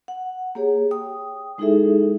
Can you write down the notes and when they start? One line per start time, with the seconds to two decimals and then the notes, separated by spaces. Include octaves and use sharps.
0.08 F#5
0.55 A#3 G4 G#4 C#5
0.91 G5 D#6
1.58 G#3 D#4 E4 G#4 A4 E5